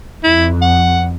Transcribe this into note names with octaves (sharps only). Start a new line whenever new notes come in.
F2 E4
F#5